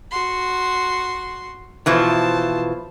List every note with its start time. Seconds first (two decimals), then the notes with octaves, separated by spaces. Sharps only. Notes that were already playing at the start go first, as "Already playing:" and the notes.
0.11 F#4 C6
1.86 B2 E3 F3 C5 A5